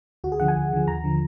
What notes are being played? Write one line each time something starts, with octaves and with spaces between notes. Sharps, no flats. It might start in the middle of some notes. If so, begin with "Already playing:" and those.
D2 F#4
G#4
D3 F3 F#5
G#5
D2
D3 F3
D#2 A#5
D3 F3